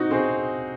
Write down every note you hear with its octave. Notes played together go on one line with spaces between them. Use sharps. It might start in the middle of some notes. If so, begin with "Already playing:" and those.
Already playing: C4 D#4 F#4
C4 G#4